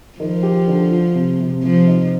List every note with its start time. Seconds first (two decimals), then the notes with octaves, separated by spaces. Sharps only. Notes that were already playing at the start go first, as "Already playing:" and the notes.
0.19 D#3 F3
0.43 G4
0.68 D3
0.91 F4
1.15 C3
1.40 C3
1.63 C3 F3
1.87 D#4